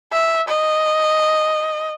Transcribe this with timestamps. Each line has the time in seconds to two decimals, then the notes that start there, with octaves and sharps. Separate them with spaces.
0.12 E5
0.48 D#5